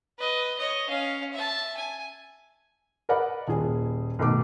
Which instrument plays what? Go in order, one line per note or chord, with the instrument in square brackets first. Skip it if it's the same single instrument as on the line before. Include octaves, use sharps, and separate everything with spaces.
[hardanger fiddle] B4 D#5
C#5 D#5
C#4 F5
E5 A5
G#5
[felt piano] A#4 B4 D5 D#5 F#5 B5
D#1 A#2 G#4
B1 D#3 A3 D6